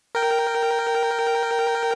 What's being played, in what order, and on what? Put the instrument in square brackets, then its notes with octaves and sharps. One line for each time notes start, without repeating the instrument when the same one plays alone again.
[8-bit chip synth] A#4 G5